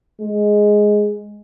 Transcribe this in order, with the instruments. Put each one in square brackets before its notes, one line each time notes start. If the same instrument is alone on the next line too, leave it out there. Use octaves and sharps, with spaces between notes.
[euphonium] G#3